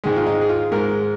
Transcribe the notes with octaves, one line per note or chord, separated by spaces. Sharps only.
G#2 D#3 G#3 G#4
F4
D#4
G#4
F4
G#2 G#3 A#4